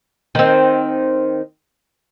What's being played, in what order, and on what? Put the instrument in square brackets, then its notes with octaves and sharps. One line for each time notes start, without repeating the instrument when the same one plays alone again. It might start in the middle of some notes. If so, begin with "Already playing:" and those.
[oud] D#3 C4